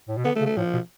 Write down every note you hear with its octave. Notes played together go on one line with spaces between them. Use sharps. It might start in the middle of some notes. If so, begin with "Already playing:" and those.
A2
B2
D3 B3
A3
C#3
A3
A2 F3
B2